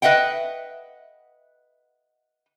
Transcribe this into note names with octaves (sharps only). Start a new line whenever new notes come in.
B4 D#5 E5 F#5 G5